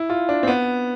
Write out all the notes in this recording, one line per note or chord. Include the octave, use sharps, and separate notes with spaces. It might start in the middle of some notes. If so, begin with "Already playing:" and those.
Already playing: E4
F4
D4
C4
B3